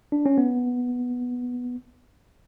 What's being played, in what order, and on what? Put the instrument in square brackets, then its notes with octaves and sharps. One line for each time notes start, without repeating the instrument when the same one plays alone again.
[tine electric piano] D4
C#4
B3